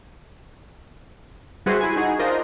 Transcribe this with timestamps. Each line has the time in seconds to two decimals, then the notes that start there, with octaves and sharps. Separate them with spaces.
1.66 G3 E4 F#4 G#4 B4 C5
1.81 E4 G#5
1.96 D#4 F#4 G#4
2.19 D4 F4 A#4 C5 D#5